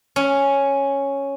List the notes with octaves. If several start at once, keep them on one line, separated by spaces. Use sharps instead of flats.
C#4